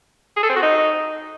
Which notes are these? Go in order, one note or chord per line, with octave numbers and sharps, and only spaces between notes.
G#4
A4
C4
F#4
D#4